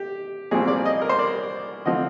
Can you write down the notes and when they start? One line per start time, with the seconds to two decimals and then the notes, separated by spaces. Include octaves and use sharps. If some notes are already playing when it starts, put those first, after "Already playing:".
Already playing: G4
0.51 C2 A#2 F3 C4 G#4
0.68 D5
0.85 D#5
1.01 A#4
1.09 C5
1.19 D5
1.85 D3 F3 C4 D#5